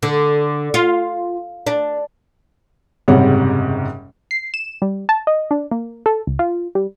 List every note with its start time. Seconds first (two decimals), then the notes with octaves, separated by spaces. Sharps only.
0.03 D3
0.74 F4
1.67 D4
3.08 F#1 G#2 C3 G3 C#5 F#5
4.31 C7
4.54 E7
4.82 G3
5.09 A5
5.27 D#5
5.51 D4
5.71 A#3
6.06 A4
6.27 C#2
6.39 F4
6.75 G3